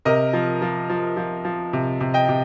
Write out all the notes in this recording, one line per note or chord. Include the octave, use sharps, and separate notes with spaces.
C3 A#4 D#5
F3
F3
F3
F3
F3
C3
C3
D#5 G5
C3